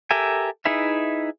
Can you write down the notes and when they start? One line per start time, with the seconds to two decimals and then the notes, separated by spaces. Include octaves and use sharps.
0.11 G4 A4 A#4 E5 G#5
0.65 D#4 E4 G#4 B4 E5